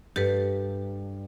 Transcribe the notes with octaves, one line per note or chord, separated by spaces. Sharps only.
G2 G4 A4 B4